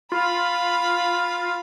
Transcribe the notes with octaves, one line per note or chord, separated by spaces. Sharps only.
F4 F5 B5